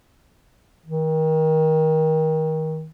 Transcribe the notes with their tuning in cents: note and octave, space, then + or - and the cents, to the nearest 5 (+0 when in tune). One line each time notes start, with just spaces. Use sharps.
D#3 +25